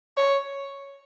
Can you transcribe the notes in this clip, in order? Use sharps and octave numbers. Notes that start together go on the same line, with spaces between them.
C#5